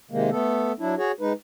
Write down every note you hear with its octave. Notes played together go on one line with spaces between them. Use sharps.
C3 D#3 G#3 A#3
A3 B3 A4
F#3 D4 E4
F#4 G#4 C#5
G#3 D#4 B4